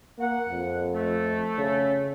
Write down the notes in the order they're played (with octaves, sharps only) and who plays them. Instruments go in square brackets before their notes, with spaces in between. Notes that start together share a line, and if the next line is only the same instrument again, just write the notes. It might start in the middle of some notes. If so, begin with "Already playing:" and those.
[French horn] A#3 [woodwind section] F#5
[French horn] F2
[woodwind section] A3
[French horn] C#3